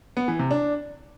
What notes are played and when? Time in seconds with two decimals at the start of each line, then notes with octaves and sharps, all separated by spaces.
0.17 B3
0.28 E3
0.39 C3
0.51 D4